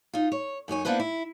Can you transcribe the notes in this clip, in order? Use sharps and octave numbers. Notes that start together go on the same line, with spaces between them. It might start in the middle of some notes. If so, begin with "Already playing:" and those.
D#4 F4
C#5
F#2 D#4 C#5 G#5
A#3 B3 D4 E4 B4 C5
E4